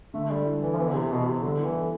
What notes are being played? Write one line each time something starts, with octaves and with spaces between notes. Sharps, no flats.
D3 A3
A3
G3 A4
E4
E3 A4
F3
E3 B3
D3
C3 E3
B2 B3
C3 B3
D3 G3
E3 E4
A4